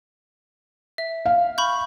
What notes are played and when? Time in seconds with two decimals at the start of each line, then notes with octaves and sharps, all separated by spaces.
0.98 E5
1.26 F5
1.58 B5 C#6 G6